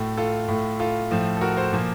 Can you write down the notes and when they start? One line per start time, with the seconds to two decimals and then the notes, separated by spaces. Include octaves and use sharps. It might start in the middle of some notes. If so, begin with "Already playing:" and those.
Already playing: A2 A3 F#4
0.17 F4 A4
0.48 A2 A3
0.80 F4 A4
1.11 A2 F3 A3
1.37 A4
1.41 F#4 A#4
1.56 A4 C5
1.72 A#2 F3 A#3